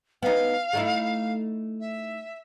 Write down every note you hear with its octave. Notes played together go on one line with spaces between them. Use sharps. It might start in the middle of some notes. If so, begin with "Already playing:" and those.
B3 D#4 F5
A3 D#4 E4
E5